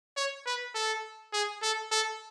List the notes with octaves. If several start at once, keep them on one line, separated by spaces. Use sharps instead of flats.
C#5
B4
A4
G#4
A4
A4